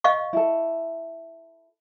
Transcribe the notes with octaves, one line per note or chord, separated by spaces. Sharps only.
D#5 F5 C#6
E4 A4